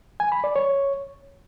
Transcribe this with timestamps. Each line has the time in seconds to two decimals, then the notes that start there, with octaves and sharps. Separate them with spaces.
0.20 G#5
0.32 B5
0.44 D5
0.56 C#5